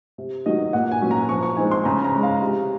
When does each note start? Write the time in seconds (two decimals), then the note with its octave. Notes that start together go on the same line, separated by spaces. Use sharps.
0.18 C3
0.46 D#3 F#3 D#5
0.73 A#2 F#5
0.92 G#5
1.01 F#3 C#4
1.11 A#5
1.29 F3 C#6
1.43 C#6
1.57 G#3 C4 D#4 G#5
1.71 C6
1.85 C#3 A#5
2.04 A#5
2.14 G#3 C#4
2.23 F5
2.42 C3